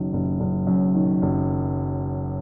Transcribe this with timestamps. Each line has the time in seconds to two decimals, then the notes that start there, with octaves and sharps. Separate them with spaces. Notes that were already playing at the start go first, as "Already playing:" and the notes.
Already playing: F#1 F#2 D#3
0.13 F#1
0.40 F#1
0.67 F#2
0.95 D#3
1.22 F#1